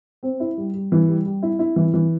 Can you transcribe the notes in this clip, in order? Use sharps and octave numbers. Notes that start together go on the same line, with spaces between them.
C4
E4
G3
G3
E3
G3
G3
E4
E4
E3
E3